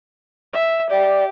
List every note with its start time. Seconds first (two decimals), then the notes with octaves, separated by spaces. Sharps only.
0.53 E5
0.90 G4 D5